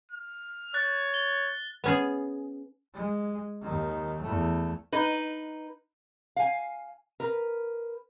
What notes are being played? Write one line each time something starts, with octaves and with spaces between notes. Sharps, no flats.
F6
C#5 F#6 A6
G7
B3 C#4 G#4
G#3
D#2 D#3
E2 A3
D#4 B4
F5 G#5
A#4 B4